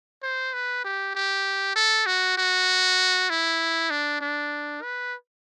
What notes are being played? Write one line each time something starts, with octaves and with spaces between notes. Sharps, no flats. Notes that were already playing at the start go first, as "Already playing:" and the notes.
C5
B4
G4
G4
A4
F#4
F#4
E4
D4
D4
B4